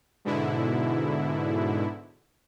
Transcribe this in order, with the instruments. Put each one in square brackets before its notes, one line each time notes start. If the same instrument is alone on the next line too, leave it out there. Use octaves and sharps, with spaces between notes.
[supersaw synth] G#2 B2 D3 E4